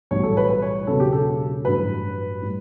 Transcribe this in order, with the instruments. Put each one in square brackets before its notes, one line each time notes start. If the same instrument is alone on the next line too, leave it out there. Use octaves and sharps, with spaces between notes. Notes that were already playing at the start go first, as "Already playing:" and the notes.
[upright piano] B1 A2 E3 G3 C#5
A4
B4
B4
C#5
E1 E2 C#3 F#3 A4
G4
A4
A1 G2 F#3 B4
A2 G3